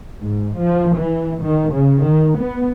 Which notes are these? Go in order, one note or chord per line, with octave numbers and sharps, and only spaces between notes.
G#2
F3
E3
D#3
C#3
D#3
B3